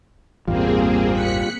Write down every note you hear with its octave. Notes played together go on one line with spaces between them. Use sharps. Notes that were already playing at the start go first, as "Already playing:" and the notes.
A1 E2 G2 G3 A#3 C4 F4 G#4
F#6 B6 C#7